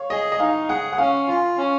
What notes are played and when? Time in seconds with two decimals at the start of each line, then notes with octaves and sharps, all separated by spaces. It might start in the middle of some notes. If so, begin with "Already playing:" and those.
Already playing: C#5 F5
0.10 G#4 D#5
0.32 D#5
0.40 D#4 F5
0.69 G#4 F#5
0.93 F#5
0.98 C#4 F5
1.27 F4
1.57 C#4